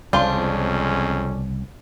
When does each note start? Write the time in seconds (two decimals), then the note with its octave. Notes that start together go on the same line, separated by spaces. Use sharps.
0.13 C2 F2 C#3 G#3 C#4 D4 F4 C5